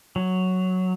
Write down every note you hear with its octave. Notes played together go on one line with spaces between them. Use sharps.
F#3